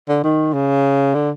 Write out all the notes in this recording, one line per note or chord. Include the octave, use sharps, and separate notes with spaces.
D3
D#3
C#3
D3